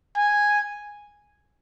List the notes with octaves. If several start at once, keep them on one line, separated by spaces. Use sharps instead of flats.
G#5